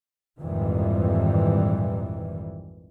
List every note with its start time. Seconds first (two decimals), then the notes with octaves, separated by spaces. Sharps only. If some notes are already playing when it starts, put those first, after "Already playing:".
0.40 A#1 F2 G#2 D#3 E3 G3